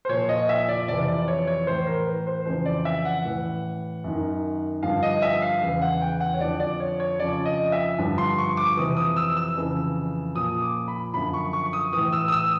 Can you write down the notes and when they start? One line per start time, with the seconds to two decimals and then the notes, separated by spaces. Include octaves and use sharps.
0.05 C5
0.09 A#2 F3 C#5
0.29 D#5
0.49 E5
0.69 D5
0.88 F2 C3 E3 D5
1.08 D5
1.28 C#5
1.47 C#5
1.67 A2 E3 C5
1.87 A#4
2.07 B4
2.27 C5
2.46 F2 C#3 E3 C5
2.66 D5
2.85 E5
3.05 F#5
3.25 A2 E3
4.04 F#2 D#3
4.83 G2 D3 F3 F5
5.03 D#5
5.22 E5
5.42 F5
5.62 E2 C#3 E3 F5
5.82 F#5
6.01 G5
6.20 F#5
6.34 C#5
6.41 F2 D3 F3 D5
6.60 D5
6.80 C#5
7.00 C#5
7.19 F2 C#3 F3 D5
7.45 D#5
7.72 E5
7.98 G2 D3 F3
8.18 C6
8.38 C#6
8.57 D6
8.77 F2 C3 E3 D#6
8.97 D#6
9.16 E6
9.37 E6
9.56 F2 C#3 E3
10.35 A#2 F3 D#6
10.62 D6
10.88 B5
11.14 F#2 D3 F3 B5
11.34 C#6
11.53 C#6
11.73 D#6
11.93 A2 E3 D#6
12.12 E6
12.28 D#6
12.32 E6